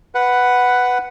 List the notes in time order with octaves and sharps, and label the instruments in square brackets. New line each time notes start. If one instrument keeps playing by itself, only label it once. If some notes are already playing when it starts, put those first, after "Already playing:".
[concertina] B4 F#5